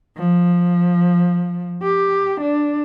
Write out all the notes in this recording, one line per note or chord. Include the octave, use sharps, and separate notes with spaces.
F3
G4
D4